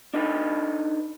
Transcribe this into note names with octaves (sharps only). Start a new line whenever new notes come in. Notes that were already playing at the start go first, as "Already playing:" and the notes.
D4 D#4 A4 B4